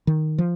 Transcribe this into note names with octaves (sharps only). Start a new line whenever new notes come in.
D#3
F3